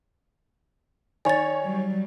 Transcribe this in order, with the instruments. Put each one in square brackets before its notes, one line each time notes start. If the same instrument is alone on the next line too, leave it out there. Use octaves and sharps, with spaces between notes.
[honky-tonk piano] D#3 C#5 [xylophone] D5 A6 [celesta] G#5
[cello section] F#3 G3